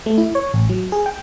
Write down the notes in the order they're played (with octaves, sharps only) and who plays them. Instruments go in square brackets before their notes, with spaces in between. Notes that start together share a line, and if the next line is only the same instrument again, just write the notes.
[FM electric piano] A3
E4
C#5
A1
F#3
G#4
G5